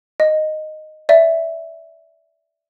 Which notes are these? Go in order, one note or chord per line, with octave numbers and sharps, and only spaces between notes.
D#5
D5 E5